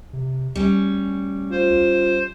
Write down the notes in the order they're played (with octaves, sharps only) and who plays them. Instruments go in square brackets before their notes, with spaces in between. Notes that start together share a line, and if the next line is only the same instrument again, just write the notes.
[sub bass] C3
[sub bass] D2 [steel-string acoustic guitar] G3 C#4
[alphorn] F4 [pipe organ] C5